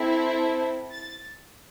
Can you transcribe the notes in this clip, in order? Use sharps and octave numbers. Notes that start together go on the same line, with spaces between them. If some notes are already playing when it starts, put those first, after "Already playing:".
Already playing: C4 E4 A4
A6